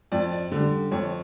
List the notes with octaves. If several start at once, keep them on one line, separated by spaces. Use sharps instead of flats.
F2 D5
D3
G3
F2 C#5